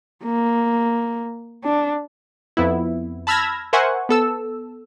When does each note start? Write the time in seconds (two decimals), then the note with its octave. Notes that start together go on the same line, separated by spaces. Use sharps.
0.24 A#3
1.64 D4
2.57 F2 B3 E4
3.27 A5 B5 E6 F6 G#6 A#6
3.73 A#4 C5 E5 F#5 G#5 C#6
4.09 B3 A4 E6